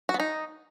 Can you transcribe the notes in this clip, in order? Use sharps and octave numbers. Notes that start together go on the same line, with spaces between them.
F#4
B3
D#4